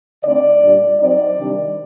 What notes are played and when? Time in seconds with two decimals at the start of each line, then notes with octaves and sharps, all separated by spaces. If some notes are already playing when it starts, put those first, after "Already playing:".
0.23 D3 A3 C4 D#4 D5
0.62 A#2 G3 D4
0.99 F#3 C4 D#4 D5
1.37 C3 D#3 G3 D4